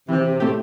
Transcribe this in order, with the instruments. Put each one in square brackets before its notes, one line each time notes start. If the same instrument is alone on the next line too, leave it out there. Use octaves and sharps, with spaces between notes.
[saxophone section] C3 [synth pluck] E3
[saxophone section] C3
[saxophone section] A2 [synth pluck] A3 C4 G4